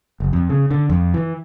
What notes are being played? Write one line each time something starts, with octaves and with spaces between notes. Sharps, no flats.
F#1
F2
C#3
D3
F2
E3